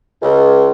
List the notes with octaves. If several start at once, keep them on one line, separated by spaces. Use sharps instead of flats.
C#2